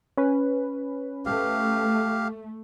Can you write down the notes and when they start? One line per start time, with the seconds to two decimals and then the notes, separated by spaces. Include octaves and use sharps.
0.17 C#4 B4
1.26 A3 G4 F5